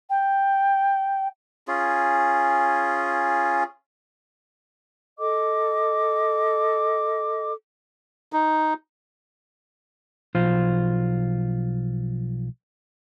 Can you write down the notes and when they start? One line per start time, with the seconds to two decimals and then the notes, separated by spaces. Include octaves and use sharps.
0.09 G5
1.68 C#4 F4 G#4
5.19 A4 D#5 D6
8.33 D#4
10.35 B1 F3 F4 C5